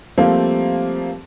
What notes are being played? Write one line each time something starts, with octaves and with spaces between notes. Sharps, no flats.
F3 G3 A3 A#3 C4